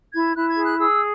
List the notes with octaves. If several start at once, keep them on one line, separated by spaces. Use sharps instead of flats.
E4 G#6
E4 F#6
G#6
G#4
F#6
G#4 E6